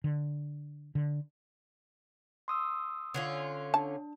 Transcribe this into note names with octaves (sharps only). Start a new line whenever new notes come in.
D3
D3
C6 D#6 E6
D3 C#4 F4
D4 A5